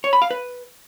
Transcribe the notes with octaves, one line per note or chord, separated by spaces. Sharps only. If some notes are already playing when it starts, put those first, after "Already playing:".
C#5
B5
F5
B4